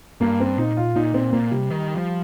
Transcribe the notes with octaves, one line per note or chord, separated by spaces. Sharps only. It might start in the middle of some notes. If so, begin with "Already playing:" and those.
G2 A#3
C4
A#2 D#4
F4
A#2 D#4
A#2 C4
A#2 A#3
C3 G3
D#3
F3